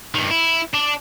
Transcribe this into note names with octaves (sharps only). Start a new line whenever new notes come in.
G2 D#3
E4
D4